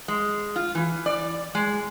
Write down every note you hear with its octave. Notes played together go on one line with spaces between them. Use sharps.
G#3
F4
E3
D5
G#3